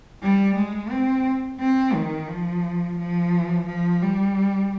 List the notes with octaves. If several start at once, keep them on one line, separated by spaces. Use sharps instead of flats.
G3
G#3
C4
C4
D#3
F3
F3
F3
G3